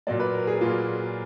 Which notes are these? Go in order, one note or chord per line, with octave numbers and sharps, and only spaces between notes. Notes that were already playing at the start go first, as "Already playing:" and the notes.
A#2 F#3 A#3 D5
B4
A#4
G#4
A#2 F#3 A#3 F4